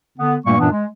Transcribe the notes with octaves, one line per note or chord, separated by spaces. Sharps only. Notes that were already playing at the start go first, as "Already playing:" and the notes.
D3 B3
G2 A#2 G3 A3 A#3 C#6
F#2 A#2 E3 B3 D4
G#3